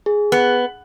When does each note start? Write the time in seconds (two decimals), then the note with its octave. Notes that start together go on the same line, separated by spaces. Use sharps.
0.06 G#4
0.32 B3